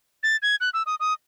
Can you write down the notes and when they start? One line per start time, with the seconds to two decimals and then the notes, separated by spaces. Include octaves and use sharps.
0.23 A6
0.42 G#6
0.61 F#6
0.74 E6
0.86 D#6
1.00 D#6